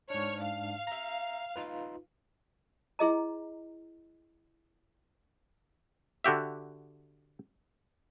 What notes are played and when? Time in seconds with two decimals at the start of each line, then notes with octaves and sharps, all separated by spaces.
0.10 G#2 D4 C#5 F6
0.43 F5
0.87 E5 A#5
1.56 D#4 F4 B4
2.99 E4 G#4 D#5 A#5
6.24 D3 F#4 G4 E5